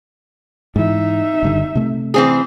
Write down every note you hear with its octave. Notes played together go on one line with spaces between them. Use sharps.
G#2 E3 D#4 E5
F#1 G2 D3
C3 A3
E3 C4 G#4